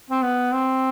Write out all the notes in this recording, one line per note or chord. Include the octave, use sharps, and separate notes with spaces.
C4
B3
C4